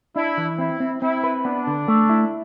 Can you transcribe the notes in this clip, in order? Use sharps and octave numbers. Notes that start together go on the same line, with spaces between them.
D4 E4
E3
C4 E4
C4
C4 E4
B4
B3 D4
D3
A3
E4